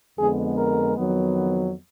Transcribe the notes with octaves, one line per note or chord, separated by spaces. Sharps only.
F2 D3 G#3 B3 G#4
A#4
F2 D#3 F#3 B3